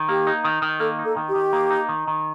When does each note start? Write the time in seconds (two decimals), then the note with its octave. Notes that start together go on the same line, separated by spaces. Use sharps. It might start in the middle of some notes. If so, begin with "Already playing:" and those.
Already playing: D#3
0.09 A#3 G4
0.27 D#4
0.45 D#3
0.62 D#3
0.80 A#3 A4
0.99 D#4
1.05 A4
1.17 D#3
1.29 G4
1.35 D#3
1.53 A#3
1.70 D#4
1.89 D#3
2.08 D#3